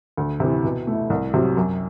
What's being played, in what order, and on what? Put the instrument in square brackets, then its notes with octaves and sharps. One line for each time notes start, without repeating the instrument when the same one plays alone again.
[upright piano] D2
C3 E3
B2
A3 E4
C2
C3 F#3
F#2